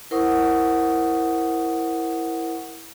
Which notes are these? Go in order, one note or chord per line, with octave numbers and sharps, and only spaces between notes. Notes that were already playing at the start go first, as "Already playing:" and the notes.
E4 A#4 C5 F#5 C#6 D#6